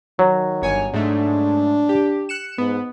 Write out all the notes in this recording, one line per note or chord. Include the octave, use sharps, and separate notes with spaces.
D#3 F#3
G1 C#5 G#5
G#2 A3 D4
G4
F#6 C#7 E7
G#2 B3